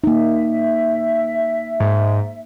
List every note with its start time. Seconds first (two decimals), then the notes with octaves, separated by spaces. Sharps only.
0.04 A#3 D#4 E5
1.80 G#2